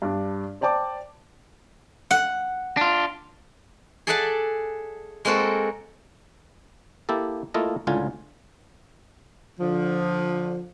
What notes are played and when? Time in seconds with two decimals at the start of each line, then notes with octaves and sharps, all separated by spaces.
0.02 G2 D4
0.61 C5 D5 G5 A5 D6
2.11 F#5
2.77 D4 F4
4.07 G#4 A4 D5 E5 F#5 A5
5.25 G#3 A#3 C4 F#4 A4
7.09 A#3 E4 G4 A4
7.54 A3 A#3 E4 F4 A4 D#5
7.87 C#2 A2 D3 F4 G#5
9.59 D3 F3